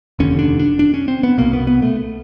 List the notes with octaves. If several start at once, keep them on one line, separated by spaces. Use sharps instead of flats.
F1 D#2 D3 C#4
D4
D4
D4
C#4
C4
B3
C2 B2 A#3
B3
B3
A3